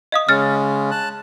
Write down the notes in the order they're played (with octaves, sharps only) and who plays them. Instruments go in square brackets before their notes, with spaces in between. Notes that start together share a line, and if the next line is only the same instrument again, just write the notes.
[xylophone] D#5 F5 D#6
[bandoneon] C#3 G#3 C#4 [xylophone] F6 A6 C#7
[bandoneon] A5 F#6